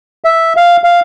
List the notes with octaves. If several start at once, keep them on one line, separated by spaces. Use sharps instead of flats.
E5
F5
F5